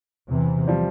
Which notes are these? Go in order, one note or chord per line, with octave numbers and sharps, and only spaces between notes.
E2 C3 E3
F3 G3